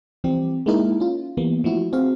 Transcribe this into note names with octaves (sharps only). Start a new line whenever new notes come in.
E3 F3 G3 C4 G4
G#3 A#3 D#4 E4 A#4
C#4 F4
E3 G3 A#3 B3
F3 A3 E4 F#4
C4 F#4 G#4 F5